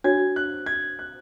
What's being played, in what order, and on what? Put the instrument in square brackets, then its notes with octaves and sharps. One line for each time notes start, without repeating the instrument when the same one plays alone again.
[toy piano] D4 F#4 C#5 [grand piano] G#6
[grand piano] F#6
G#6
F#6